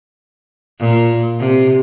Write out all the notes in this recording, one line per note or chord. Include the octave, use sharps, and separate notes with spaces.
A#2
C3